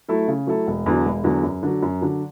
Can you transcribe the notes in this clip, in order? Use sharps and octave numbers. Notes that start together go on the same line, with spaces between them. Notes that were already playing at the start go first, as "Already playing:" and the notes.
F#3 A3 E4 A4
C#3
F#3 A3 E4 A4
E1
E2 D3 F#3
E1
E2 D3 F#3
F#2
D3 F#3
F#2
D3 F#3